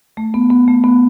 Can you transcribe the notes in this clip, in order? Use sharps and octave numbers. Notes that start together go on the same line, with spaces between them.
A3
B3
B3
A3
B3